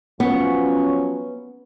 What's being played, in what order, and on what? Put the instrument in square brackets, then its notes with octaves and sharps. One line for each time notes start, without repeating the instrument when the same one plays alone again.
[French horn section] F3 F#3 C#4 [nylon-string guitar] B3